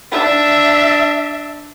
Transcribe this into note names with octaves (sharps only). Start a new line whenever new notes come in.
D4 E5